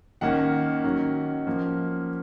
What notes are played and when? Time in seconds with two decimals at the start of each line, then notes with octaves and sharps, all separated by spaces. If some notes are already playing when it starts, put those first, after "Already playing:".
0.21 D#3 A#3 C#4 F#5
0.84 D#3 F#3 C#4
1.47 F3 A#3 C#4